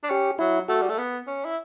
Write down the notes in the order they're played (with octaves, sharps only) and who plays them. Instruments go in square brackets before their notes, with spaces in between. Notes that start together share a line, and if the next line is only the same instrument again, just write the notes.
[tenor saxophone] D4
[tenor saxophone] C#4 [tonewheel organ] G4
[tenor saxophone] F#3 [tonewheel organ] E4
[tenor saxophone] A3 [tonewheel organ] F#4
[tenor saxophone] G3
A3
B3
C#4
E4